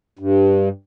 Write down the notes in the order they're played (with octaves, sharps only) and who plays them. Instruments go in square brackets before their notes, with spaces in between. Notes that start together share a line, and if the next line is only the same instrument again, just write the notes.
[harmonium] G2